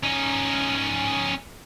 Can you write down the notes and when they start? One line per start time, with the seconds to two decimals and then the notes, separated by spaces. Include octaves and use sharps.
0.04 C#4 D#4